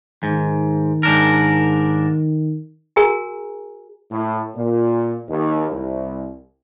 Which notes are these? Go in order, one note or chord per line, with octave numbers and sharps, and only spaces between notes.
G#2 D#3
G#2 D4 A#4
F#4 G#4 A#4 G#5 A#5
A2
A#2
D#2
C2